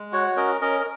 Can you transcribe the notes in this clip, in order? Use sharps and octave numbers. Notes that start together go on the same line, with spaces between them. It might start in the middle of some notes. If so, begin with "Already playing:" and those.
Already playing: G#3
F#4 C#5 F#5
C#5
C#4 A#4 D#5
C#4 A#4 D#5
A#4